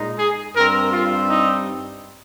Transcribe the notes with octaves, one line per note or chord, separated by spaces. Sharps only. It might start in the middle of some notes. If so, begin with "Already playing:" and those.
Already playing: A#2 G#3 D#4
G#4
G2 G3 C4 A#4
F4
D#4